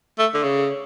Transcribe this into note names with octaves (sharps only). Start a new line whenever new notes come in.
A3
D3
C#3